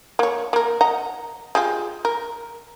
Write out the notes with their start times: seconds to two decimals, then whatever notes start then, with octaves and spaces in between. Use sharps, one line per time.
0.19 A#3 C#5
0.53 A#3 A#4
0.81 D#5 F#5 A#5
1.55 G#3 F4 G4
2.05 A#4